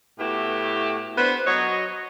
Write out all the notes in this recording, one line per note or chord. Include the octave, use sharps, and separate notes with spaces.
A2 A3 B3 E4 F#4 G4
B3 D4 B4 C5
F#3 C#5 D#5